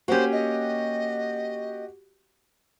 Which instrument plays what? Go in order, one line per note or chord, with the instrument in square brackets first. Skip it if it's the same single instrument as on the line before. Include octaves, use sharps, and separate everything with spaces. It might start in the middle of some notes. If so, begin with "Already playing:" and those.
[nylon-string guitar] A#3 C#4 [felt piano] F#4 G4 [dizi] C5
[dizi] D#5